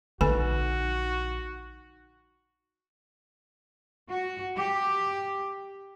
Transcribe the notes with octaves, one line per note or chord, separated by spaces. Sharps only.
A#1 D3 D#4 F#4 A4 G#5
F#4
G4